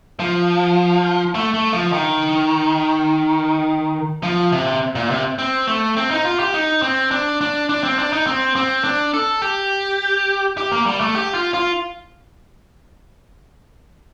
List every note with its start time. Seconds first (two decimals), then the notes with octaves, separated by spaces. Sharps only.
0.20 F3
1.35 A3
1.54 A3
1.73 F3
1.93 D#3
4.23 F3
4.52 C3
4.95 A#2
5.10 C3
5.38 C4
5.68 A3
5.97 C4
6.11 D#4
6.25 F4
6.39 G4
6.54 D#4
6.82 C4
7.11 D4
7.41 D4
7.69 D4
7.84 C4
7.99 D4
8.13 D#4
8.27 C4
8.56 C4
8.84 D4
9.14 A4
9.42 G4
10.58 G4
10.72 A#3
10.86 G3
11.00 A3
11.15 G4
11.34 F4
11.54 F4